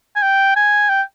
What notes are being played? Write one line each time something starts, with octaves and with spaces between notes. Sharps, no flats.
G#5
G5
G#5
G5